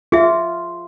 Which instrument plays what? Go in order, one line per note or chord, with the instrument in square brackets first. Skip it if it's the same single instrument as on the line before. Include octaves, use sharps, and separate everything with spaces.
[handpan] F4 [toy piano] G#4 E5